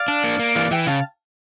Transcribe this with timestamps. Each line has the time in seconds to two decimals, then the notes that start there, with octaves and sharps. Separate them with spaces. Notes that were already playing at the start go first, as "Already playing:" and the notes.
Already playing: D5 F5
0.08 D4
0.24 A#3
0.39 A#3
0.55 E3 D5 F5
0.71 E3 E5 G5
0.87 C#3 F5 A5